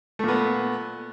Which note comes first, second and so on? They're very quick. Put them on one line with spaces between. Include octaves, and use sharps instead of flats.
A3 A#2 B3